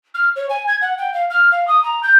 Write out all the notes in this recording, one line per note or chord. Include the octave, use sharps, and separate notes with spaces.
F6
C#5
G#5
G#6
F#5
G5
F5
F6
F5
D#6
A#5
G6